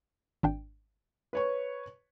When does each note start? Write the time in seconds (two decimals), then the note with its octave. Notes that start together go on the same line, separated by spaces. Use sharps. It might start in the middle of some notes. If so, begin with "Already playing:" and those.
0.43 G#1 D4 G5
1.33 B4 C#5 C#6